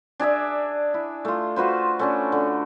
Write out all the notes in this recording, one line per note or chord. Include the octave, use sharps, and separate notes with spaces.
D4 G#4 D5 E5
E4
A3 F4
F4 F#4 B4 C5
A3 C#4 D4
D3